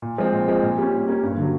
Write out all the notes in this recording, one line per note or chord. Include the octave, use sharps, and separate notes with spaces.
A#2
F3 G#3 C4
A#2
F3 G#3 C4
A#2
G3 A#3 C#4
A#2
G3 A#3 C#4
G2
D3 F#3